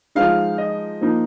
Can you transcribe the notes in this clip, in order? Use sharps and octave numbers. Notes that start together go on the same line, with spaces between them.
F3 G#3 D#4 F5
D#5
F3 A#3 D#4